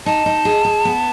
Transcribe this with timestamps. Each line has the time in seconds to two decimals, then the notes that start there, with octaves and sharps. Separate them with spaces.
0.06 D#4 A5
0.26 D#4
0.45 G#4
0.65 G#4
0.85 B3